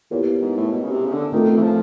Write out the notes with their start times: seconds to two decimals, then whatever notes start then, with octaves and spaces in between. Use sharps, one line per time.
0.11 A#2 B3 E4 G4 A#4 C#5
0.41 G#2
0.57 A2
0.72 B2
0.83 C#3
0.92 C3
1.06 C#3
1.12 D3
1.32 D#3 A3 C4 F4 A4
1.57 E3
1.63 F3